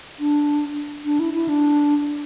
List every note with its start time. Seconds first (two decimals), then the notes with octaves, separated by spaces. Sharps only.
0.20 D4
1.05 D4
1.20 E4
1.34 E4
1.48 D4